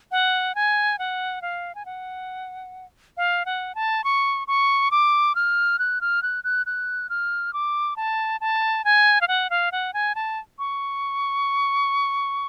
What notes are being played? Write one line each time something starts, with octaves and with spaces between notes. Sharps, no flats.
F#5
G#5
F#5
F5
G#5
F#5
F5
F#5
A5
C#6
C#6
D6
F6
F#6
F6
F#6
F#6
F#6
F6
D6
A5
A5
G#5
F5
F#5
F5
F#5
G#5
A5
C#6